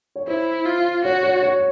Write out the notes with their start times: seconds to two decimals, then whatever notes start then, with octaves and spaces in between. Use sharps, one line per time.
0.15 C#5
0.28 E4 C5
0.66 F4
1.05 F#4 C#5
1.23 C#5
1.42 C#5